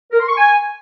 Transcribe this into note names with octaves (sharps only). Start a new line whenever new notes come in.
A#4
C6
C#6
G#5